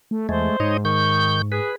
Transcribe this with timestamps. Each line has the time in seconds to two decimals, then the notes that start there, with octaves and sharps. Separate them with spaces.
0.11 A3
0.29 E2 G#3 A3 C5
0.60 G#2 D#4 C#5 D#5
0.85 D#3 C#6 G6
1.52 G#4 B4